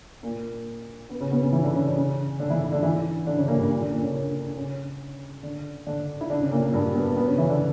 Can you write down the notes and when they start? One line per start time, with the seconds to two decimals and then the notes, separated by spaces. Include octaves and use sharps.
0.23 A#2 A#3
1.09 B3
1.20 C#3 C#4
1.31 B2 B3
1.42 C#3 C#4
1.53 E3 E4
1.63 D3 D4
1.75 C#3 C#4
1.85 D3 D4
1.97 C#3 C#4
2.39 D3 D4
2.50 E3 E4
2.72 D3 D4
2.83 E3 E4
3.26 D3 D4
3.37 C#3 C#4
3.48 A#2 A#3
3.58 G2 G3
3.70 A#2 A#3
3.81 D3 D4
3.91 A#2 A#3
4.02 C#3 C#4
4.56 C#3 C#4
5.43 D3 D4
5.87 D3 D4
6.21 E4
6.30 D3 D4
6.41 C#3 C#4
6.52 A#2 A#3
6.62 A#2 A#3
6.73 G2 G3
6.95 B2 B3
7.06 B2 B3
7.17 B2 B3
7.27 C#3 C#4
7.38 E3 E4
7.49 D3 D4